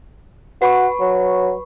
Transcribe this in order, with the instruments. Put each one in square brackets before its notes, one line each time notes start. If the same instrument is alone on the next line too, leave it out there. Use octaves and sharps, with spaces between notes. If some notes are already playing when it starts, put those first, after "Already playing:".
[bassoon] F#4 [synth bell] B4 B5 C#6
[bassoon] F#3